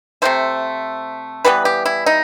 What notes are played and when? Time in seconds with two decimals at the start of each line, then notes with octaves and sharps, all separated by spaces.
0.22 C3 F#3 A3 C5
1.45 E3 G3 B3 B4
1.65 G4
1.86 E4
2.06 D#4